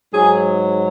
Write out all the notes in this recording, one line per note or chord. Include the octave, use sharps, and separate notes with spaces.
G#2 F#3 G#4